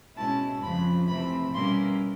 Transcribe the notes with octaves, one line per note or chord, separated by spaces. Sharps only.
B2 G#3 C#4 E4 A5
F2 C#3 F3 B5
C3 E3 A3 C4 B5
B2 G3 A#3 C#4 E4 C6